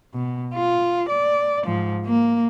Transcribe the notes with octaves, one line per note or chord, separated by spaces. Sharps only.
B2
F4
D5
G#2 F3
A#3